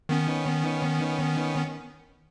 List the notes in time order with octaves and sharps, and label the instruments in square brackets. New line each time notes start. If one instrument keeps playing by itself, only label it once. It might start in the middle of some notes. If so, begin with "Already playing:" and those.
[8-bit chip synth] D#3 B3 C#4